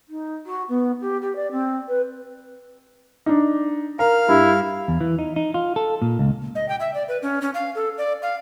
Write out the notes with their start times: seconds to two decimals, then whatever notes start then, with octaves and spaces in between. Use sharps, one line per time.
0.09 D#4
0.46 F#4
0.69 B3
1.01 G4
1.21 G4
1.35 D5
1.51 C4
1.88 B4
3.26 D4 D#4
3.99 A#4 F5
4.29 G2 E4
4.88 E2
5.01 E3
5.19 D#4
5.36 D#4
5.54 F4
5.76 A4
6.02 A#2
6.19 C#2
6.55 D#5
6.69 G5
6.80 E5
6.94 D5
7.08 B4
7.23 C#4
7.42 C#4
7.54 F5
7.75 A4
7.98 D5
8.22 F5